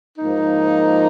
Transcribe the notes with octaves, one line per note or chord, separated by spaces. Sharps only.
G#2 F3 A#3 D#4